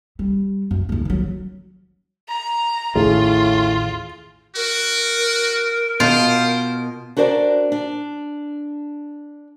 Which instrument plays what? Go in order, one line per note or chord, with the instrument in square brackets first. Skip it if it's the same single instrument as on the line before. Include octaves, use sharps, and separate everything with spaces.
[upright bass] G3
F#2
D#2 G#2
D#3 F#3
[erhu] A#5
[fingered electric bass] A1 D#2 [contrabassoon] A2 [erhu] F4 [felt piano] G#4
[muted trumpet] F#4 [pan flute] A#4
[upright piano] B2 [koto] F4 [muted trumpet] C5
[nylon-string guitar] D4 F#4 A#4 C5 D5
D4